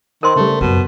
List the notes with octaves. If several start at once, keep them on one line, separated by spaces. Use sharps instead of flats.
D#3 A#4 C5 C6
C#3 G3 A3
F#2 B2